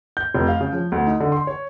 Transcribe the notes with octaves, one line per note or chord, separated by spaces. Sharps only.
G6
F1
F5
C#3
F3
D2
D#4
D3
C6
C#5